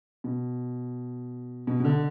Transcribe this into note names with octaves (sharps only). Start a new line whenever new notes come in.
B2
B2
B2
D3